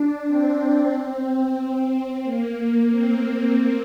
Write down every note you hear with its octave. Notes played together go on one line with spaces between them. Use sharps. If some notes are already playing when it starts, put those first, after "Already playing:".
Already playing: D4
C4
A#3
C4